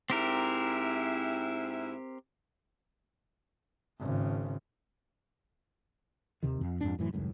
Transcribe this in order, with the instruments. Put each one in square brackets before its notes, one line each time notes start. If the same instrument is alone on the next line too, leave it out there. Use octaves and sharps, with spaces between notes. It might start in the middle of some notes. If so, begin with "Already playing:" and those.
[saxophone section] G#2 E4 [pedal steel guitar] C4 G4 A#4
[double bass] G#1 C#3
[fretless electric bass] D#2 C3 D#3
F2
F2 G#2 D4
F#2 A2 E3
D#1 C#2 F#2 A2